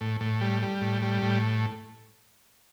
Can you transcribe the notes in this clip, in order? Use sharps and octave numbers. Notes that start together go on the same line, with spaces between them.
A2
A2
G3
G3
A2
G3
A2